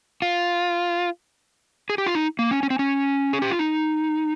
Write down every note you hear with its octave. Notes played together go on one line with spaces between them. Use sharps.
F4
G#4
G4
F4
D#4
A#3
C#4
C#4
C4
C#4
G#4
G4
F4
D#4